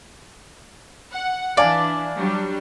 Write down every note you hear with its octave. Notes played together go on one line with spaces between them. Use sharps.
F#5
E3 D4 D5 F5 G#5 A5
F#3 G3 D4